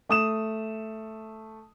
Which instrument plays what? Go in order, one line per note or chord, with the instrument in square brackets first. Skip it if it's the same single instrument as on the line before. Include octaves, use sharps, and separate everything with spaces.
[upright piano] A3 D#6 E7